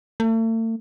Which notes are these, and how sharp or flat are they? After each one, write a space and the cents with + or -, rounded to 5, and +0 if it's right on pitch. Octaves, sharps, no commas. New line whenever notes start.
A3 +40